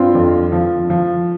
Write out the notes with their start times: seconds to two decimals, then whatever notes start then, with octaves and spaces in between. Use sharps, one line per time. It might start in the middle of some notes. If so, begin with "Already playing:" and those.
Already playing: G2 C4 F4
0.15 F2
0.52 F3
0.90 F3